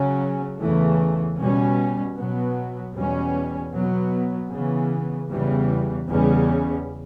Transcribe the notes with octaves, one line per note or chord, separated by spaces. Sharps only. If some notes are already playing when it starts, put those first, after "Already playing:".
Already playing: C#3 F#3 C#4
E2 C#3 E3 A3
B2 G3 C#4
B2 F#3 B3
E2 B2 G3 C#4
B2 F#3 B3
C#3 E3 B3
E2 C#3 E3 G3
E2 C#3 G3 C#4